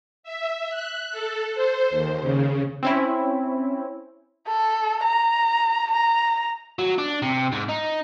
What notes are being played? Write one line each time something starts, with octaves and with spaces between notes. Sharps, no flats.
E5
F#6
A4
C5
D#2
C#3
C4 C#4 E4
A4
A#5
A#5
F#3
D4
C3
G#2
D#4